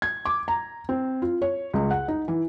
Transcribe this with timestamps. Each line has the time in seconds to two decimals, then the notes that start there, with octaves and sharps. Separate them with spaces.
0.02 G#6
0.25 D6
0.48 A#5
0.89 C4
1.22 F4
1.42 C#5
1.73 C#2
1.91 F#5
2.08 D#4
2.28 E3